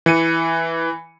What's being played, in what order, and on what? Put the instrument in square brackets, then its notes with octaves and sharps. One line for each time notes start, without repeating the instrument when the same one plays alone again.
[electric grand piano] E3 C#7 D#7